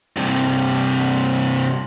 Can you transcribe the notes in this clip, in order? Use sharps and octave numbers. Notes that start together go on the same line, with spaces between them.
G2 C3